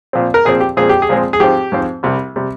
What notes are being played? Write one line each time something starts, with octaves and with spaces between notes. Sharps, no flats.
A#2 F3 C4
A#4
A#2 F3 C4 G#4
G4
A#2 F3 G#3 C4 G#4
G4
G#4
A#2 F3 G#3 C4
G#4
G#2 F3 C4 G4
G#2 F3 C4
C2 C3 G3
C3 G3